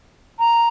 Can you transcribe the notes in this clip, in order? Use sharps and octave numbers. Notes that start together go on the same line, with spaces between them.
A#5